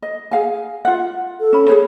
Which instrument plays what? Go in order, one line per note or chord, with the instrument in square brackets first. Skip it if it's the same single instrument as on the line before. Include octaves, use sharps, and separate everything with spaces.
[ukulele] D#5
G#4 F5 G#5
F4 F#5
[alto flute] A4
[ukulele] C#4 B5
G#4 B4 C#5